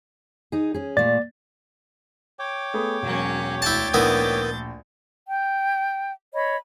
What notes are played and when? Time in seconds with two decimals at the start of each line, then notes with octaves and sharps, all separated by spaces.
0.52 D#4 G#4
0.74 C#4 G#4
0.97 A#2 A3 D5 A6
2.39 C#5 G5 D6
2.74 A3 B3 G#4
3.02 E1 F#3 A#3 C#4
3.62 D2 E4 A5 G6 A6
3.94 A#1 D#3 B3 E4
5.26 G5
6.33 C#5 D#5 B5